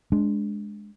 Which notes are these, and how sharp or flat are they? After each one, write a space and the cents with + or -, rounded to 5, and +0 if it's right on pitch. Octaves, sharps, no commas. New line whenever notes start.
G#3 +0 D4 -15